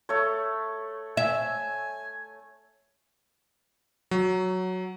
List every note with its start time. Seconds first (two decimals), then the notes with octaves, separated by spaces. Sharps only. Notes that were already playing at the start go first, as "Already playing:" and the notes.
0.09 A3 C#5
1.17 E5 G#5
4.11 F#3